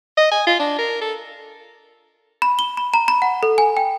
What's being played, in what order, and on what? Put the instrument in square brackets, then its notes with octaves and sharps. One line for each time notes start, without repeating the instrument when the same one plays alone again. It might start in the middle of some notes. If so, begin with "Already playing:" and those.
[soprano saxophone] D#5
G#5
F4
D4
A#4
A4
[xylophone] B5
G7
B5
A#5
B5
F#5
A4
G#5
G5